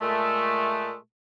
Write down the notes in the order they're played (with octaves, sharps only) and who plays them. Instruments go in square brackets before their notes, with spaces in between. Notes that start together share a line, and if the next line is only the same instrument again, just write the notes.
[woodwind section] A#2 G#3 A3